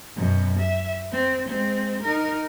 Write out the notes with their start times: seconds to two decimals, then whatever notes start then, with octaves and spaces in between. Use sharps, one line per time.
0.16 F#2 B2
0.59 E5
1.12 C4
1.49 G#3 C4
2.03 D#4 A#4